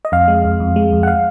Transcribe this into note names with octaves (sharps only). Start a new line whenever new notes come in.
D#5
F2 F5
G#3
F2
F2
G#3
F2
F#5
F5